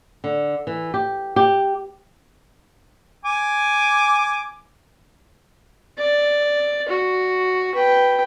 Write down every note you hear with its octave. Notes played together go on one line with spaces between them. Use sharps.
D3
E3
G4
G4
G#5 D6
D5
F#4
B4 G5